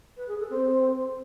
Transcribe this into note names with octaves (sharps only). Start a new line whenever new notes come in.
B4
G#4
A4
C4